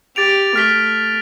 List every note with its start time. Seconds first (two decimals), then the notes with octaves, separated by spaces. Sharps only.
0.16 G4 A6 D7 F7
0.56 A3 F6 B6 G7